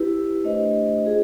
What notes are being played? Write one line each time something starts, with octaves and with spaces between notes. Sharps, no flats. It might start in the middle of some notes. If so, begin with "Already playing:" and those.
Already playing: E4 G4 B4
A3 D4 G4 C5 D#5
F4 G#4 C5 D#5